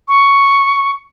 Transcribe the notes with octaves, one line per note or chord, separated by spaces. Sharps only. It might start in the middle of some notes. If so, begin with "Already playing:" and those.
C#6